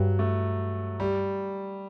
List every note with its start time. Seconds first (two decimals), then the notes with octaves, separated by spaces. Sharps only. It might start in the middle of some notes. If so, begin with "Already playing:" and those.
Already playing: G2 F#3
0.19 A3
1.00 G3